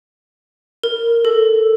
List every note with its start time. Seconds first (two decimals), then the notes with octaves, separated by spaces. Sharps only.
0.84 A#4
1.25 A4